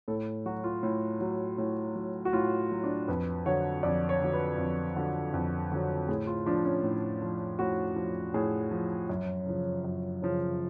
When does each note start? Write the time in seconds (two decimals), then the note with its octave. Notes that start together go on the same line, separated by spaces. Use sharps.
0.08 A2 A4
0.46 F#3 F#4
0.64 F4
0.83 A2
1.21 F#3
1.58 A2
1.96 F#3
2.25 F#4
2.33 A2 F4
2.72 F#3
2.84 D4
3.08 F2 B4
3.46 D3 F#3 C#5
3.83 F2 D5
4.09 C#5
4.21 D3 F#3
4.33 B4
4.58 F2
4.96 D3 F#3
5.34 F2
5.72 D3 F#3
6.08 A2 G#4
6.27 F4
6.46 F3 D4
6.65 C#4
6.83 A2
7.22 F3
7.59 A2 F#4
7.96 F3
8.34 A2 G#4
8.71 F3
9.09 F#2
9.46 C#3 F3
9.84 F#2
10.22 C#3 F3